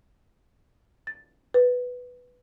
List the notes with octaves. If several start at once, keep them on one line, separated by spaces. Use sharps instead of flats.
A6
B4